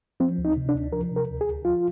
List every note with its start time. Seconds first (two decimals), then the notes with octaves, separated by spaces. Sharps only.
0.20 F3 C4
0.38 D2
0.45 D#4
0.57 C3
0.69 D4
0.75 D2
0.93 F3 A#4
1.12 C3 A#4
1.30 D2
1.41 G#4
1.47 D2
1.65 F3 F4